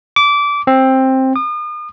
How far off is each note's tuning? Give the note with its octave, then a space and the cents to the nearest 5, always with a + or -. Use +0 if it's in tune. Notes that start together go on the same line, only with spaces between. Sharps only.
D6 -20
C4 +10
D#6 -40